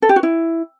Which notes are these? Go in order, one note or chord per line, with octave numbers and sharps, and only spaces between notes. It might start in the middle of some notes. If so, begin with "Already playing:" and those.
A4
G4
F#4
E4